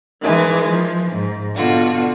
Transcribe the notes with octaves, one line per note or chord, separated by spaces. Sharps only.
D#3 E3 G#3
F3
G#2
B2 D3 F4 F#4